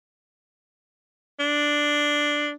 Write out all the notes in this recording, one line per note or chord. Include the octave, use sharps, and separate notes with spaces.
D4